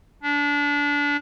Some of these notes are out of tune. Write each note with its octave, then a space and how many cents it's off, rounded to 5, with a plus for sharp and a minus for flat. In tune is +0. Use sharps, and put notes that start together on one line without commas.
D4 -25